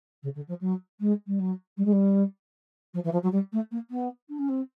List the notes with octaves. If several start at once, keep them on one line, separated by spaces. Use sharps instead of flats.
C#3
D3
F3
F#3
G#3
G3
F#3
G3
G#3
G3
F3
E3
F3
F#3
G3
A3
A#3
B3
D4
C#4
C4